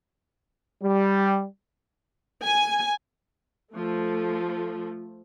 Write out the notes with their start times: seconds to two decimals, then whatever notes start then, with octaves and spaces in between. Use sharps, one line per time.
0.82 G3
2.44 G#5
3.74 F3 A3